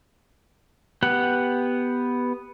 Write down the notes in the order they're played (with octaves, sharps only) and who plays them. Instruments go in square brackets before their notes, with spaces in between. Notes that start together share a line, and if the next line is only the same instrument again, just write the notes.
[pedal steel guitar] B3 G4 F#5